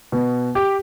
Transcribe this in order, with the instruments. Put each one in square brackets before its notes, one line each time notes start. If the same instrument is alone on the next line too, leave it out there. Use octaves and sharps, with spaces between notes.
[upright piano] B2
G4